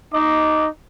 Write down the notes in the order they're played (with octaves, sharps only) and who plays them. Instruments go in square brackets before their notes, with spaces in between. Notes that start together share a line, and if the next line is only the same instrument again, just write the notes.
[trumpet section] D#4 D#5 D6